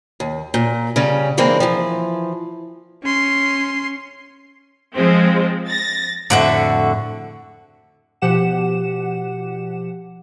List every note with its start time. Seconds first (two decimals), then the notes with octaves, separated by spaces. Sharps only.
0.20 D#2
0.54 A#2
0.96 C#3 G3 C#4
1.37 D3 E3 G#3 A#3 C4
1.60 E3 F3
3.04 C#4 C6
4.94 F3 G#3 C4
5.68 A6 A#6
6.30 F2 A2 D3 F#4 E5
8.22 B2 F3 G4 F#5 E7